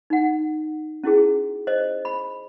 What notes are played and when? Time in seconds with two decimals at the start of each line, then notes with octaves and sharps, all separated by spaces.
0.10 D#4 F#5
1.04 C#4 E4 F#4 G#4
1.67 C5 D#5
2.05 B5